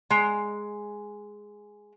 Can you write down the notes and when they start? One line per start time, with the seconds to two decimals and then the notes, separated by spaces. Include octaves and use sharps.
0.10 G#3 A#5